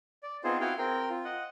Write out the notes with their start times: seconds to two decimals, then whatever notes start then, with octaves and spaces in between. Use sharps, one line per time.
0.23 D5
0.44 B3 C4 D#4 F4 G#4 C5
0.60 E4 F#4 G#4 F5 G5
0.78 C4 A#4 G5
1.10 F4
1.25 D#5 F#5